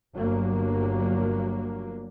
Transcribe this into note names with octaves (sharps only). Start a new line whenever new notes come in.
G1 F#3 A#3